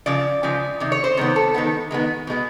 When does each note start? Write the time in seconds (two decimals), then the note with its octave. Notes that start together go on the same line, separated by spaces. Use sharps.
0.06 C#3 F3 D5
0.43 C#3 F3 G#3
0.80 C3 D#3
0.92 C#5
1.04 C5
1.17 C3 D#3 G#3 B3
1.36 A4
1.54 D#3 G#3 B3
1.91 D#3 G#3 B3
2.27 B2 G#3 B3